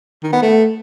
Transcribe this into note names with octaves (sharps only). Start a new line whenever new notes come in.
D#3
B3
A3